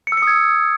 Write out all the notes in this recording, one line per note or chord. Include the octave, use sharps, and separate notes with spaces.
C#7
E6
C#7
D#6
G#6